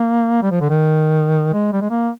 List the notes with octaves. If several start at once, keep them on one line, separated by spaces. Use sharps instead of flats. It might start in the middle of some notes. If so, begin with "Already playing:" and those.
Already playing: A#3
G3
F3
D3
D#3
G#3
G3
G#3
A#3